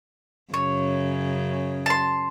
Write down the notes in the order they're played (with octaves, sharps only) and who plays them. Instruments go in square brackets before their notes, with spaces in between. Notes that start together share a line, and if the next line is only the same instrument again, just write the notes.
[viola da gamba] F#2 C#3 [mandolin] C#5
[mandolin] A5 C6